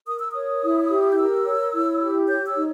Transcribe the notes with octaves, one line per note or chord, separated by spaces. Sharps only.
A#4 D#6
E6
C#5 D#6
E4
G4
G6
A#4 E6
C#5
E4
G4
C#5 G6
E6
D#4